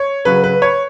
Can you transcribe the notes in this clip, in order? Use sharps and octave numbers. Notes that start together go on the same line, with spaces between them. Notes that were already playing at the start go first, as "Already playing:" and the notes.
Already playing: C#5
C#3 F#3 B4
B4
C#5